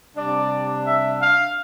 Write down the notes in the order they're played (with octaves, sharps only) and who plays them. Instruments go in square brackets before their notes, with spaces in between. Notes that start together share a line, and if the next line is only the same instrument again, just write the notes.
[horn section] C3 G3 D4 D5
E5
F5